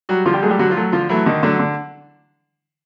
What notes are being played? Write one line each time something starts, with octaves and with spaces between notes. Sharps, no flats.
F#3 G3 F#4
D3 F3 F4
G3 G4
F#3 G#3 A3 G#4
G3 G4
D3 F#3 F#4
F3 F4
F#3 A3
D3 F3 F4
E3 F#3 A3 E4
D3 D#3 D#4
D3 F#3 A3 D4
D3